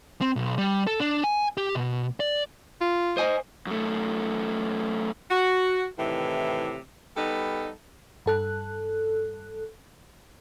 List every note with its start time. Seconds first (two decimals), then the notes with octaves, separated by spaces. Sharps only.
0.21 C4
0.36 B1
0.58 G3
0.87 A4
1.00 D4
1.24 G#5
1.57 G4
1.75 B2
2.20 D5
2.81 F4
3.17 C5 D#5 G#5
3.67 F#2 A3
5.31 F#4
5.99 A2 C3 D#3 E3
7.17 G3 B3 D#4 A4
8.26 G2 A4 F#6